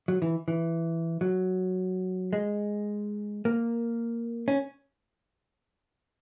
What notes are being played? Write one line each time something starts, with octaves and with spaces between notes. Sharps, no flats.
F#3
E3
E3
F#3
G#3
A#3
C#4